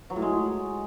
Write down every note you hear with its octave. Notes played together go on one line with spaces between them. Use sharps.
F#3
A2
G#3